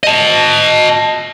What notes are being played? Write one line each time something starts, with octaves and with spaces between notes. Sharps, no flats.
D#5 A5